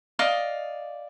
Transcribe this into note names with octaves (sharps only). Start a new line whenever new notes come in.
D5 D#5 F5 D6